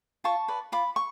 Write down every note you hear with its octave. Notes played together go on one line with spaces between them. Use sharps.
F4 A5 C#6
B4 D5
F4 B5 D6
C#6